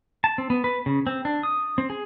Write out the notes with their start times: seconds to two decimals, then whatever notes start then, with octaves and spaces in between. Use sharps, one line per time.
0.24 A5
0.38 C4
0.50 B3
0.64 B4
0.86 C#3
1.07 C4
1.25 D4
1.43 D#6
1.78 C4
1.90 G#4